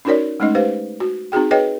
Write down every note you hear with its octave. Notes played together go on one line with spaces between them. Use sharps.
C#4 D#4 F#4 A#4 C#5 D5
G#3 A3 C#4 D#4 D#5
G4 B4 C5 F5
F#4
C4 D#4 F#4 G#4 G5
G#4 B4 C#5 D#5 G5